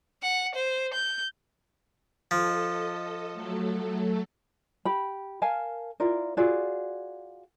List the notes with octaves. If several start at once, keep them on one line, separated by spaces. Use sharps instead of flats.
F#5
C5
G6
F3 A4 D#5
F#3 A3 A4
G4 B5
A#4 F5 G#5 A5
E4 F4 A#4 D5
F4 F#4 G#4 D5